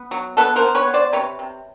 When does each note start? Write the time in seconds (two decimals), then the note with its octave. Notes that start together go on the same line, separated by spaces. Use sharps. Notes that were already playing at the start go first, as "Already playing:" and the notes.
Already playing: B3
0.11 F#3
0.37 B3 A4 B4
0.56 A#4 C5
0.62 B3
0.75 B4 C#5
0.88 B3
0.94 C5 D5
1.13 C3 B4 C#5
1.39 C3